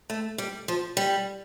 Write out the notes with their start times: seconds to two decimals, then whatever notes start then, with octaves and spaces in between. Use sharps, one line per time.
0.10 A3
0.38 G3
0.68 F3
0.97 G3